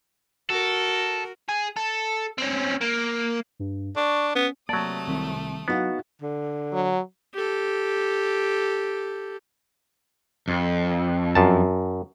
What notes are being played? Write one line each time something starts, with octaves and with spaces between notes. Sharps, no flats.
F#4 A4 A#4
G#4
A4
C4 C#4
A#3
G2
D4 C#6
B3 C#4
C3 F#3 A3 A#3 D5 A5 D#6
C2 D#3 G3
F#3 B3 D#4 E4 F#4 F5
D3
F#3
G4 A4
F2
F#2 A5